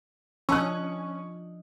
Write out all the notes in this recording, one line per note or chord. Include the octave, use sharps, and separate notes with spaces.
F3 C#4 D4 D#5 A5 C#6 E6 F#6